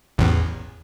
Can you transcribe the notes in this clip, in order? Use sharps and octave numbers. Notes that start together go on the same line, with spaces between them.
A1 E2